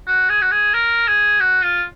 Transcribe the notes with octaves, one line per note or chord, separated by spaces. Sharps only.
F#4
G#4
F#4
G#4
A#4
G#4
F#4
F4